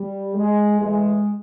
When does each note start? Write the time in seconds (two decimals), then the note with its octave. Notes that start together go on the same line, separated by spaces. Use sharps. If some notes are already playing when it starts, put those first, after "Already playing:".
Already playing: G3
0.35 G#3
0.81 A2 E3 G#3